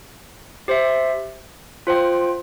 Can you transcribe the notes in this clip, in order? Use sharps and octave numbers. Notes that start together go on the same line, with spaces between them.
G4 C5 E5
F4 C5 G5